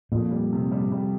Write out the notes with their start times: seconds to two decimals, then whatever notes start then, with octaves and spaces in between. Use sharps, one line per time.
0.12 F2 A#2
0.31 G3
0.52 C3
0.71 G3
0.92 G3